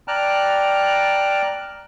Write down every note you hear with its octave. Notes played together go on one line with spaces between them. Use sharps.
D5 G5 A5 A#5 F6 F#6